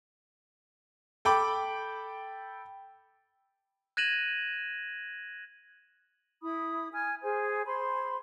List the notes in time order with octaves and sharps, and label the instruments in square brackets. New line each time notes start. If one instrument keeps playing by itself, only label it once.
[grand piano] A4 G5 B5 D6
[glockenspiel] F#6 G#6 A#6 D#7 E7 F#7
[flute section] E4 B5 D#6
G#5 F6 G#6
G#4 C5 G#5
C5 B5 C6